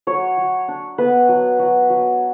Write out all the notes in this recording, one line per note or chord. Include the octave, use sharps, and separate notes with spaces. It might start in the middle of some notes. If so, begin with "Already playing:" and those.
F#3 C#5
F#3
D4
B3 B4
F#3
F#3
F#3